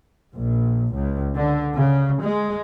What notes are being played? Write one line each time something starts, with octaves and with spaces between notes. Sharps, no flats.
A#1
C#2
D3
C#3
G#3